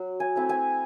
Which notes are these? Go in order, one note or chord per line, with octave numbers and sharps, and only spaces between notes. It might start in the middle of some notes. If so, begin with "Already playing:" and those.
Already playing: F#3
G#5
A3 C4 E4
G#5